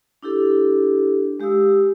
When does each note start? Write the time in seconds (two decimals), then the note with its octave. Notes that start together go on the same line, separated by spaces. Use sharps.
0.23 D4 E4 G4 A4
1.40 G#3 G4 F5 D#6 E6